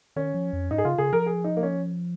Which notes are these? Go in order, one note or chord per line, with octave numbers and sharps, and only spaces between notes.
D#3 C#4
F3
F2
G#2 D#4
G#4
C#3 F4
C#3 G#4
F3 A#4
G#4
D#4
A#3
C#4